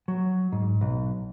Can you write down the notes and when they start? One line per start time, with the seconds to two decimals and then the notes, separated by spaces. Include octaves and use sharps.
0.08 F#3
0.52 G#2
0.81 B1